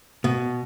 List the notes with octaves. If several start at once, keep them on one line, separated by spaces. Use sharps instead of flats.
B2